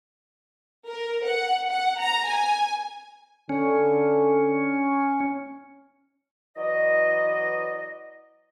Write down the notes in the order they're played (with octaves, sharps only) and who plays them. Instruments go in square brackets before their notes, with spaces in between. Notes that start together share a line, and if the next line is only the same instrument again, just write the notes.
[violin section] A#4
F#5
F#5
A#5
G#5
[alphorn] D3 [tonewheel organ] C#4
[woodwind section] E3 F#3 B4 D5 D#5